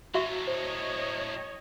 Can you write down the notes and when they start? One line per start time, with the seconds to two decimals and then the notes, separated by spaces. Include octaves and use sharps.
0.14 A2 F#3 F#4 E5 C#6
0.47 C5 C#5 D#5